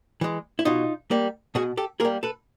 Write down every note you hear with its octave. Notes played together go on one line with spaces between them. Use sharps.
E3 G#3
E4
B2 D#4 F4
G3 A#3
B2 F#4 G#4
G4 A4
G3 A#3 G#4 A#4
A4 B4